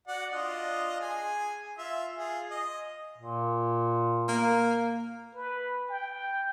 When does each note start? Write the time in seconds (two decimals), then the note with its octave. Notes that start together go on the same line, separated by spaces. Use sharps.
0.08 F#4 D5 F#5
0.32 D4 F4 D#5
1.00 G#4 G#5
1.78 F4 E5
2.17 F4 G#4
2.51 D#5
3.18 A#2
4.28 A#3
5.35 B4
5.90 G5